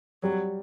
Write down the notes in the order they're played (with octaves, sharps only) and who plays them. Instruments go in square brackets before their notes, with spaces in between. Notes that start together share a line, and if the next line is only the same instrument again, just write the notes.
[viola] F#3 [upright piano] G3